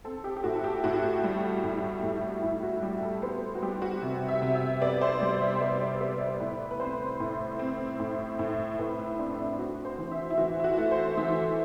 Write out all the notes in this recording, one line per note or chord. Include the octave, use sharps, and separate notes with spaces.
C4 A4
G4
G4
A2 F#4
A4
G4
A2 F#4
G3
A2
A2
A2 E4
F#4
G3 G4
A4
B3 C5
F#4
G3 G4
F#4
C3
E5
C3
E5
B3 D5
C5
G3 D5
E5
C5
B3 D5
D5
B3 E5
D5
A2 B4
B4
C4 C5
A2
C4
A2
A2
A2 B4
E4
C4 D4
E4
C4 F#4
C5
E3
E5
E4
E3 F#4
E4
F#4
A3
C5
E3 E5